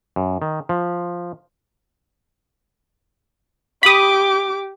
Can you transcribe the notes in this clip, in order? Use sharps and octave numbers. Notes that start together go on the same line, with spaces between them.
F#2
D#3
F3
G4 B5 D6 D#6